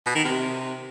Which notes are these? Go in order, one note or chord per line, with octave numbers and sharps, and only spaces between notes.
B2
D#3
C3